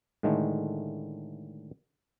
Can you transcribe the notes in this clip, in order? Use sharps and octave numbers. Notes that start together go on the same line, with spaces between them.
A2 D3 D#3 G#3 A3